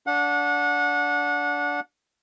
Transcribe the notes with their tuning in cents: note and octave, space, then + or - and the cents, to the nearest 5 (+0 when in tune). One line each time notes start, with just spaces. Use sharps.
D4 -20 F#5 -25